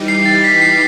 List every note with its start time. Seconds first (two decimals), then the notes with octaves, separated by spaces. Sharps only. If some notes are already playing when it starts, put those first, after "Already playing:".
Already playing: E3 G3 D#4 G4
0.08 C7
0.26 A6
0.44 B6
0.62 C7